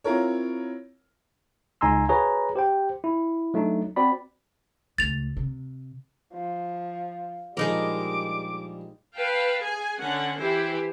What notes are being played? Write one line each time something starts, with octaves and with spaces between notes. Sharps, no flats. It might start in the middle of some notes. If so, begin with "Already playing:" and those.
C4 E4 F4 A#4 C#5
C#2 D#4 G#5 A#5 C6 E6
F#4 G#4 B4 C#5 A#5
G4 C5 G5
E4
F#3 A3 D4 D#4
C4 F#4 D5 B5
C#2 A3 A6 F7
C3
F3
A#1 G3 G#3 D#4 G#4 A#4 D6
B4 F5 G5 A5
G#4 G#5
D3 C#4 F#5
E3 E4 G4 C5